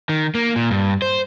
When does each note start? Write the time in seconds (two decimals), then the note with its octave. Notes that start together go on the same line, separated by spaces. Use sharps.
0.09 D#3
0.35 A#3
0.56 A#2
0.71 G2
1.02 C5